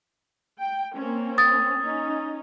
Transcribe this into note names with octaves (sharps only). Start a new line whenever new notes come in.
G5
A#3 C4 C#4
D#6 A6
C#4 D#4